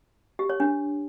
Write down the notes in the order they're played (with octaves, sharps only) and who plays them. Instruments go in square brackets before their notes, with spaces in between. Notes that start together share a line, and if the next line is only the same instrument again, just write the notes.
[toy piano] G4
C#5
D4